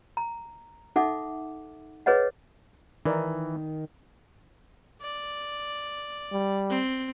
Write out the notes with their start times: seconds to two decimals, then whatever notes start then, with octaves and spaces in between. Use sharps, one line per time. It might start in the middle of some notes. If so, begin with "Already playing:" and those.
0.17 A#5
0.96 D#4 A4 E5 F#5 D6
2.06 G#4 B4 C#5 D#5 F#5
3.06 D#3 E3 D#4 A#4 D5
5.02 D5
6.32 G3
6.70 C4